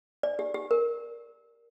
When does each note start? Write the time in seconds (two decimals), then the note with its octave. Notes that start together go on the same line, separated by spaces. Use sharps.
0.23 D5
0.39 G4
0.54 G4
0.71 A#4